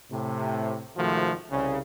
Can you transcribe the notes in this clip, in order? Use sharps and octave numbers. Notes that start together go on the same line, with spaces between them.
A2 C3
G#1 C3 D#3 F3 A3 F#4
C2 C#3